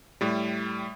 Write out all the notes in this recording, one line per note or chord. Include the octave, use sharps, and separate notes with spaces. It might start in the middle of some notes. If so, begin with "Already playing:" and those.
A2 G3